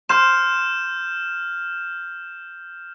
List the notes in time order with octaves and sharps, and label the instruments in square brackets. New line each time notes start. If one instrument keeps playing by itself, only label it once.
[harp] C6 [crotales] F6 G6 E7